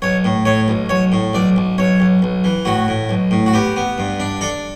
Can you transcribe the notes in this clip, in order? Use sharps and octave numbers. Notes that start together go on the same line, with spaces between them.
B1 C#5
A2
A2 C#5
B1
B1 C#5
A2
B1 D5
B1
B1 C#5
B1
B1
E3
A2 F#4
A2
B1
A2
F#4
B3 G4
B3
G2
D4
D4 A4